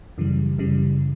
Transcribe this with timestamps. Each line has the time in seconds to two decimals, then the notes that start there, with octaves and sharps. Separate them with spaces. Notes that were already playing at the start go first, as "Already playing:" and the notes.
0.18 F#2 C#3 E3 G3
0.58 F#2 C#3 E3 G3